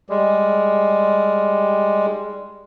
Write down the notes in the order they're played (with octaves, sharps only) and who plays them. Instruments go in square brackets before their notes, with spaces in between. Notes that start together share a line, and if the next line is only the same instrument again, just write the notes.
[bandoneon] G3 G#3